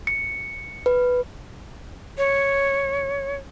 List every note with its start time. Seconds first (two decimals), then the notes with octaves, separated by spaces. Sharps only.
0.07 C#7
0.86 B4
2.18 C#5